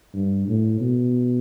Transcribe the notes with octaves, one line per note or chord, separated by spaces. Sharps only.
G2
A2
B2